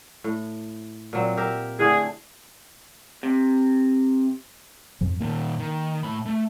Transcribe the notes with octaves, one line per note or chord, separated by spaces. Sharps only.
A2
A#2 F#3 C4
G4 A#4 E5
A2 D3 A3 G#4
C3
F2 G#2 F3
A#2 D#3 A#3
D#3
A2 B5
A3